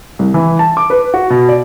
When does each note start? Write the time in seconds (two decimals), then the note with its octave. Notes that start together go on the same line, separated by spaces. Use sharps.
0.19 C2
0.34 E3
0.59 A5
0.77 D6
0.90 B4
1.14 F#4
1.30 B2
1.49 D5